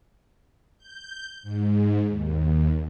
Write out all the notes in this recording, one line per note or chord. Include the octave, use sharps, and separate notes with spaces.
G6
G#2
D#2